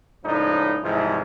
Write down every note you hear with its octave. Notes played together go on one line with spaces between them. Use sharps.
C#2 A2 F3 D4 D#4
C2 G#2 E3 F3 G#3